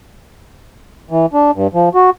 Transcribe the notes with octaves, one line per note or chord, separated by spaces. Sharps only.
E3
D4
G2
F3
F#4